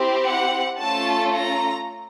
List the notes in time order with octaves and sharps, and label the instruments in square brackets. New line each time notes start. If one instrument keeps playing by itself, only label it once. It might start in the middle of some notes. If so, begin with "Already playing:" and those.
Already playing: [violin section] C4 E4 G4
F#5
A3 C#4 F4 A4 A5
A#5